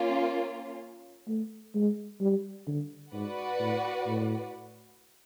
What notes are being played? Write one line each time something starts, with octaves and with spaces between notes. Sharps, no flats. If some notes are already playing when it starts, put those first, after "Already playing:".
Already playing: A#3 C#4 F4
A3
G#3
G3
D3
G#2 F#4 B4 D5 F#5
A2
A2